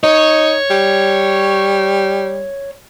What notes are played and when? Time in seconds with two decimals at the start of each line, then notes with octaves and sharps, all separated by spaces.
0.04 D#4 C#5
0.71 G3